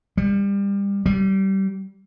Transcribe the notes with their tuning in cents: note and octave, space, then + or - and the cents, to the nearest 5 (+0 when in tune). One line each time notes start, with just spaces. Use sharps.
G3 +30
G3 -25